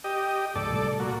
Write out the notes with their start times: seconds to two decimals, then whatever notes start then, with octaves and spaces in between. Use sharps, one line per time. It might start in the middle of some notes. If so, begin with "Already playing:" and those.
0.04 G4 D#5
0.55 C#2 G#2 A4 D5
0.70 C2 A2 G3
1.00 A#2 F#4